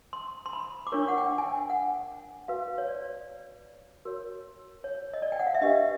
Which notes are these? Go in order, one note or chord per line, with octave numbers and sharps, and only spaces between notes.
C6
C6
B5
D6
D4 F4 A#4 C#5 C#6
F#5
G5
G#5
G5
F#5
F#4 B4 F5
C#5
D5
F#4 A#4 C#5
C#5
D#5
D5
G5
F#5
F5
E5
D4 G4 B4 D#5